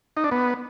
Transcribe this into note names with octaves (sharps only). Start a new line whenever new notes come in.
D#4
D4
B3